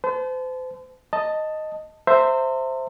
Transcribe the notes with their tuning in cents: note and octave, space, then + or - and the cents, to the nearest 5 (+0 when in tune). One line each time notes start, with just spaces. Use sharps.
C5 -40 A5 -30
D#5 +0 A5 +10
C5 +0 E5 +0 A#5 -40